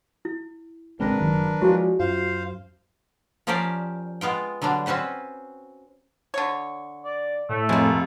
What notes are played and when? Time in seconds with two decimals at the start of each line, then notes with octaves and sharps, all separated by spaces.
0.25 E4
1.00 A1 C#3 G#3 C4 D4 A#4 B4 A#6
1.20 F#1 D#3 F#3
1.61 F3 G#3 E4 F#4 C#5 D5
2.00 F#2 F4 C5 F5
3.47 F3 C#4 G4 A#4 C5 D5
4.21 G#3 B3 F4 G5
4.62 D3 F#3 G3 D4
4.86 C4 C#4 F#4 B4 C5
6.34 D3 C#5
7.05 D5
7.49 A2 A3
7.69 F1 G#3 A#3